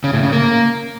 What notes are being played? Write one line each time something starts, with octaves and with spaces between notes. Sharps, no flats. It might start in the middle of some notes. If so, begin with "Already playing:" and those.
C#3
A2
C#3
A#3